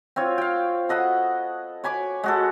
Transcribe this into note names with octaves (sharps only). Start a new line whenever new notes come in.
C4 F4 C#5
F5 G5
A4 D#5 F#5 B5
C#5 G#5 B5 D6
G#3 F#4 A4